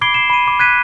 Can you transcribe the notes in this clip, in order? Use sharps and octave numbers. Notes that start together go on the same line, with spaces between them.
B5 D6 G#6 C7 D7 G7
C7 E7
B5 D#7
D6
F#6 G#6 B6 D#7